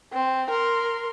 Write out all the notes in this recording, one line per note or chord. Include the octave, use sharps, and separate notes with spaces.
C4
A#4 C6